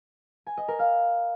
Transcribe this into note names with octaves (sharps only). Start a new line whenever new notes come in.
G#5
D#5
A#4
F5